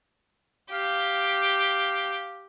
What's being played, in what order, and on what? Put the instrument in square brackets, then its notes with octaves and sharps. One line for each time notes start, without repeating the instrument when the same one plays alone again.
[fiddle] G4 [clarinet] F5